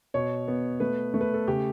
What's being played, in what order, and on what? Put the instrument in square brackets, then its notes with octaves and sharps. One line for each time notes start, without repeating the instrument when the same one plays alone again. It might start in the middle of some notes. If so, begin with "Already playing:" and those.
[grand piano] B2 C#5
B3
A3 B4
A3
B4
A4
C#3 G4